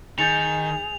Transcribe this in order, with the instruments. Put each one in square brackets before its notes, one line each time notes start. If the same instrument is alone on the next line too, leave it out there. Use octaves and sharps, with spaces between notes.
[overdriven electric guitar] D#3 [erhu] G#4 [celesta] G6 A6 C#7 [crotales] F7